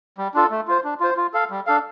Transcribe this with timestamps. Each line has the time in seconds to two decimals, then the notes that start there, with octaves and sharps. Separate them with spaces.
0.18 G3
0.34 D4 F4 A4
0.51 A3
0.68 F4 C5
0.84 D4
1.00 F4 C5
1.17 F4
1.34 A4 F5
1.50 G3
1.67 D4 A4 F5